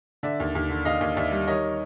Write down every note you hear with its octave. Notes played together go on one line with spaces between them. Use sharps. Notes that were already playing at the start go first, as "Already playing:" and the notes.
D3 D5 E5
D#2
D#2
D3
D#2 D#5 F5
D#2
D#2 D5 E5
G3
D#3 C#5 D#5